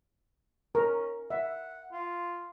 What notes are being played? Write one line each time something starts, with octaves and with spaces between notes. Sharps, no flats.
C#4 A#4
E5 F#5
F4